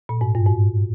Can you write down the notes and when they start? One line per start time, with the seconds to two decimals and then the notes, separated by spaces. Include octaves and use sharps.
0.09 A#2
0.21 G#2
0.35 G2
0.46 G#2